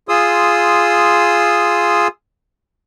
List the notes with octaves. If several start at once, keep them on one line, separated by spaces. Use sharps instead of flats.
F4 G#4 C6 D#6 E6